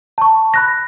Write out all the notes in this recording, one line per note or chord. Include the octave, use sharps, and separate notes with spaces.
A5 C#6
B5 F#6 A#6